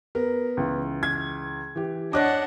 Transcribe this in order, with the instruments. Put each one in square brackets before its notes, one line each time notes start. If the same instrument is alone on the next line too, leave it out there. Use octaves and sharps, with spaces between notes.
[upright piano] B3 [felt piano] A#4
[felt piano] C#2 E3
[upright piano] G#6
[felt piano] E3 G4
[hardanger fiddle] D4 F#5 [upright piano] C#5 D#5 [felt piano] D6 F#6 A#6